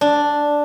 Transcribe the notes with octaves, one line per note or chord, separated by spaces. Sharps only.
D4